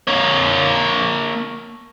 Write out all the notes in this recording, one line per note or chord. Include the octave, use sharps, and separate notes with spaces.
A#3 C#5